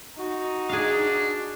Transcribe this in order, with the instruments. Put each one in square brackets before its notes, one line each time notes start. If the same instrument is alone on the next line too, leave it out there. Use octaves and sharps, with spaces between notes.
[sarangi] D#4 [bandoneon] F#4
[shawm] D4 [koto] G#4 F5